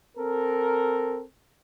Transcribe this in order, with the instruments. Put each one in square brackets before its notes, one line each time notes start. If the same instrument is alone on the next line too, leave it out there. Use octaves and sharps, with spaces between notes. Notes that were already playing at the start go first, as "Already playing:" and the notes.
[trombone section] C4 A4 A#4